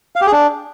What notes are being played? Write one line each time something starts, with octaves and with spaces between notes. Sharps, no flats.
F5
G4
G#4
D4